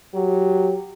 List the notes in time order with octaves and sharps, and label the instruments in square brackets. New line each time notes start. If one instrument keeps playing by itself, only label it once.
[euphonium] F#3 [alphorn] G4